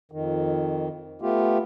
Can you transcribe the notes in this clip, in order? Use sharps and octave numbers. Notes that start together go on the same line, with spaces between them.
F2 D#3
A3 B3 F4 G4